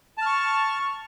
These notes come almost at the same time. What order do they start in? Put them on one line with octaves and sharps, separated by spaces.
A5 F6 C#6